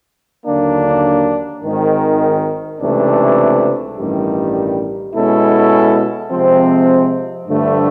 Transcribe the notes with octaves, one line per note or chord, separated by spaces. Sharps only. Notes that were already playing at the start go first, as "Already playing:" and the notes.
D#2 D3 F#3 A#3 D4
G#1 G#2 D#3
C#2 C3 E3 A3 D4
A1 G2 D#3 G3
B2 G#3 C#4 E4 A4
C3 F3 G#3 C4
G2 D3 F3 A3